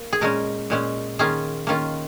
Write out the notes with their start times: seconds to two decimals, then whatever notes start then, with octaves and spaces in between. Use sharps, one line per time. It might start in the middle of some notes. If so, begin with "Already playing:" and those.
Already playing: A#3
0.13 G#4
0.21 A#2 G#3 C#4 A#4
0.70 A#2 G#3 C#4
1.19 D#3 A#3 C#4 F4 G#4
1.67 D#3 A#3 C#4 F4